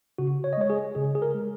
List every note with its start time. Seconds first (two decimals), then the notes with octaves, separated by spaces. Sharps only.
0.18 C#3 F#4
0.44 C#5
0.53 D#5
0.57 G#3 C#5
0.70 G#4
0.95 C#3 G#4
1.15 G#4
1.22 A#4
1.34 G#3